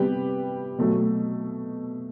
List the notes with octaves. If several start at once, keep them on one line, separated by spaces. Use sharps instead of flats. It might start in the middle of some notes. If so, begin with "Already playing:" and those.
Already playing: C3 G3 B3 G4 B4
B2 F#3 A3